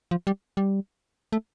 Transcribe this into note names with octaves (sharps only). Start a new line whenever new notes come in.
F3
G3
G3
A3